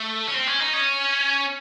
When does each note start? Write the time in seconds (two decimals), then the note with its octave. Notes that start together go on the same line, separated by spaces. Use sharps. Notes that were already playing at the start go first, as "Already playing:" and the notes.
Already playing: A3
0.28 C#4
0.34 C4
0.47 C#4
0.60 D#4
0.73 C#4